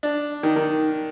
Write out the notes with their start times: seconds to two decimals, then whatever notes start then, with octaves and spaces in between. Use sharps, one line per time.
0.03 D4
0.43 D#3
0.56 D#3